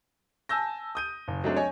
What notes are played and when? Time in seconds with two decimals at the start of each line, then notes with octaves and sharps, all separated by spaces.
0.49 G#5 A5 E6 G6 A#6
0.95 D#6 G6 D#7
1.28 F#1
1.44 F#3 G#3 A3 C4 D4
1.56 C#5 D#5 G#5